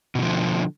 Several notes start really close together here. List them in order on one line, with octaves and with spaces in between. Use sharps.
B2 D#3 F3 D3